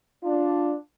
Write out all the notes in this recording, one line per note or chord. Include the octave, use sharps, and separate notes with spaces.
D4 F4